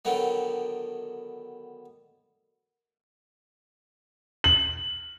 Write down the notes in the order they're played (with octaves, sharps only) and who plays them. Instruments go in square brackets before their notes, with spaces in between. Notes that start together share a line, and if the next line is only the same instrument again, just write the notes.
[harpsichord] D3 D#3 F#3 B3
[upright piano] F#7